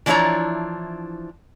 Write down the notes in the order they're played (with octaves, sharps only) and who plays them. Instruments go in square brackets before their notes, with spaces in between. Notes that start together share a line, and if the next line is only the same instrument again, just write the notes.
[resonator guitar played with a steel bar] E3 F3 D4 E4 C#5 A#5